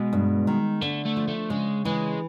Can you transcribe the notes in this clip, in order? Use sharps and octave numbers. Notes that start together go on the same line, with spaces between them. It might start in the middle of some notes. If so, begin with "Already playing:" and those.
Already playing: B2 G#3
G2
D#3
D3 A3
A3
F3
A3
C#3 G#3
E3 G#3